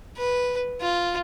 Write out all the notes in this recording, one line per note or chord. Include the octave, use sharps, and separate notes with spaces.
B4
F4